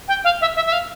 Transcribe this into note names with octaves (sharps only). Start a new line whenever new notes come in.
G5
F5
E5
E5
E5
F5